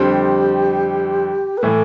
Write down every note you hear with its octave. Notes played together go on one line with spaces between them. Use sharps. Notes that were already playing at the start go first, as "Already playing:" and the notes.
Already playing: F2 D3 G3 C4 G4
B4
A2 E3 A4